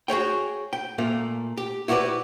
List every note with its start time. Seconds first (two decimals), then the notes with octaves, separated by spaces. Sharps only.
0.08 F#4 G#4 C#5 G5
0.73 G5
0.98 A#2 A3 A#3
1.57 G4
1.88 E4 F#4 G4 A4 B4 D5